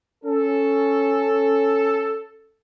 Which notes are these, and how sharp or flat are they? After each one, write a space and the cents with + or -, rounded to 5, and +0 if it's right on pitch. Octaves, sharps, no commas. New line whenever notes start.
C#4 +0 A4 +0